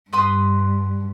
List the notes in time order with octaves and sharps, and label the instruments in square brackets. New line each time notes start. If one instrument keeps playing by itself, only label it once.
[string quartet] G2 [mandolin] B4 C6 D#6